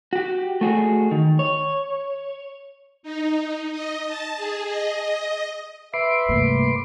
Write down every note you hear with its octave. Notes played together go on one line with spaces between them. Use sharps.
F#4 G4
A3 F#4 G#4
D#3
C#5
D#4
D#5
A5
G#4
D#5
D#5
B4 E5 B5 C6 D6
G2 C3 A3 A#3